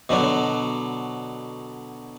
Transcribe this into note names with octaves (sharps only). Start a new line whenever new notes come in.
B2 D3 F#3